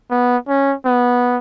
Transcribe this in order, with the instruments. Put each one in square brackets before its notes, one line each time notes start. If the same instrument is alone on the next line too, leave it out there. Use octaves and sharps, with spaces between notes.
[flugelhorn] B3
C#4
B3